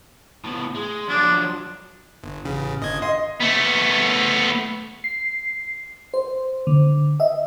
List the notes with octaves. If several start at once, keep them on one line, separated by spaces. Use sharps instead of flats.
A2 B3
G#3
F3 F#3 D4
G1
A1 C#3
G1 D#5 G#6
D#5 C6
A3 B3
C7
C5
D3
D#5 E5